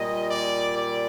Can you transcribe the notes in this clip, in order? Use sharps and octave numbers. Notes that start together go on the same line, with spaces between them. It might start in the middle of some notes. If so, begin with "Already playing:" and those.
Already playing: A#2 G3 D#5
D5
D5